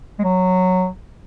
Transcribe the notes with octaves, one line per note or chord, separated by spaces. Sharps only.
G#3
F#3